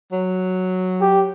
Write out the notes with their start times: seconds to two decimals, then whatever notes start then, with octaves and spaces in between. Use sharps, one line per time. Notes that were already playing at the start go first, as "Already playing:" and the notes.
0.12 F#3
1.01 G4